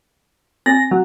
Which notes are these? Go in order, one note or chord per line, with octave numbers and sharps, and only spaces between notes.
C4 A#6
F#3